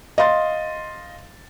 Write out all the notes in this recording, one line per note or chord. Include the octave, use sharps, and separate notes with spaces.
D#5 F5 C6 A6